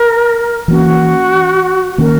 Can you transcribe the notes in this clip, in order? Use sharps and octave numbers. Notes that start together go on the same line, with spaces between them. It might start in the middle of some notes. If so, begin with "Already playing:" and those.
Already playing: A#4
E3 A#3 C#4 F#4
D#3 A#3 C#4 A#4